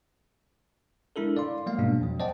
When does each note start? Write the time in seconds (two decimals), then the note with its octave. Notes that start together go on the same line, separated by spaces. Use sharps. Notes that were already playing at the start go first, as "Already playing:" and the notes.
1.16 G#3 D4 E4 A4 A#4
1.37 D5 F5 C6
1.66 F#3 G#3 A#3 F5
1.79 G#2 B2 G3 G#3 A#3 D4
2.01 F2 F#3
2.20 C5 D5 D#5 F#5 G5 A5